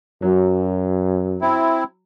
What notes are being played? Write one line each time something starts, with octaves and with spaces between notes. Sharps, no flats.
F#2 F#3
C4 E4